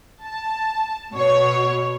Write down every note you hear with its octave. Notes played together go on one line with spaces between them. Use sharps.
A5
B2 C#5